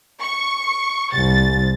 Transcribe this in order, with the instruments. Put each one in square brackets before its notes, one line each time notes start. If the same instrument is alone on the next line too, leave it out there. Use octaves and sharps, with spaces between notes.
[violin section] C#6
[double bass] C2 [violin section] A6